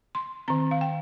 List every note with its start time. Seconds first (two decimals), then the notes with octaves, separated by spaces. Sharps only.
0.15 C6
0.48 D#3 C4 A#5
0.71 F5
0.81 G5